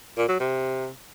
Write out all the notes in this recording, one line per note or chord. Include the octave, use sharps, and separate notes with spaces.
A#2
F#3
C3